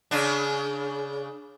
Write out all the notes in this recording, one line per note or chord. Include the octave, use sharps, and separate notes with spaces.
C#3 D4